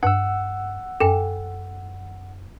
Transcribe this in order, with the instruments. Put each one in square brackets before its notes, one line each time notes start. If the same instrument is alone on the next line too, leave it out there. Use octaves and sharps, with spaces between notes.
[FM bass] G2 [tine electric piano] F#5 E6
[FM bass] F#2 [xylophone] A4 G5 G#5